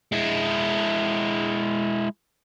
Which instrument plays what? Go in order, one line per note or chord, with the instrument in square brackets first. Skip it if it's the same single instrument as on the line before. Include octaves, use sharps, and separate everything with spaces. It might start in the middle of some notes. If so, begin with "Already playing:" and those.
[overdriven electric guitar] G#3 E4